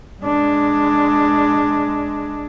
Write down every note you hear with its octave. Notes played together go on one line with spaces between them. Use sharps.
G#3 D4